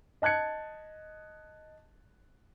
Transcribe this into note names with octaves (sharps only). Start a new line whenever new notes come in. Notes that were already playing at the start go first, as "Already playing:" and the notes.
D#5 A5 F#6 G#6 C#7